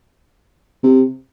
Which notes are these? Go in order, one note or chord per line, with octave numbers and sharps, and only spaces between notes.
C3